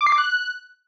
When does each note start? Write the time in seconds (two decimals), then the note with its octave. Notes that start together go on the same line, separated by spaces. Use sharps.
0.01 D6
0.06 C7
0.12 D6
0.18 F#6